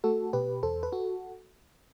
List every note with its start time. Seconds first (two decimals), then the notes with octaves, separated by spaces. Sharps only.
0.04 A3 F#4 A4
0.33 B2 G4 B4
0.63 E2 A4 C5
0.83 B4
0.92 F#4 A4